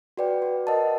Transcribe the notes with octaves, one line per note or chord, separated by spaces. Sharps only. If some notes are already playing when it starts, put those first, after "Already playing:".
F#4 B4 D5 G5
F#4
A#4 D#5 F#5 A5